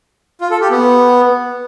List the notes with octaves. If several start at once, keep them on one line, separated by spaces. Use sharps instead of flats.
F4
A4
G4
B3